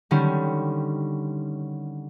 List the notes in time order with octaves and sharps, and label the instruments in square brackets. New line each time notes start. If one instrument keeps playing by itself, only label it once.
[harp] D3 D#3 G3 C#4